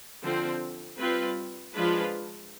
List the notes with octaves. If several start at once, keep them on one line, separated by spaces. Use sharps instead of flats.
D3 F3 C4
G3 C4 F4 B4
F3 G#3 D4 F4 B4